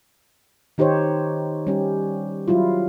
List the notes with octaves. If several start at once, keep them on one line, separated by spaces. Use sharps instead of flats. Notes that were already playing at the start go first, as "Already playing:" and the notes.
D#3 D#4 G4 C5 C#5
G3 C#4 G4
F#3 G3 E4 F4